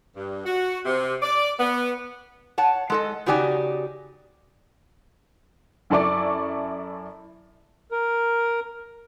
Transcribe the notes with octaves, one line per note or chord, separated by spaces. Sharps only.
G2
F#4
C3
D5
B3
C#5 F#5 A5
G#3 A4 D#5
C#3 D#4 F#4 G4 D5 G#5
F#2 E4 A4 D5 C#6 D6
A#4